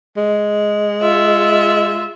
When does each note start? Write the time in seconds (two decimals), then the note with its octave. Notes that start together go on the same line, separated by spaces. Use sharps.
0.17 G#3
1.02 F4 E5